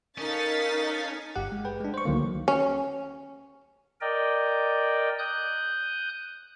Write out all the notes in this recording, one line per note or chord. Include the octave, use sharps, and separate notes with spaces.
C#4 D#4 A4 A#4 F5 A6 B6
G1 G2 G4 F#5
G#3
G#4 B4 G5
G#3 D4
C5 C#6
C#2 D3 D#3 F#3 A3 A#3
C#4
A#4 D5 D#5 G5
D#6 F#6 G6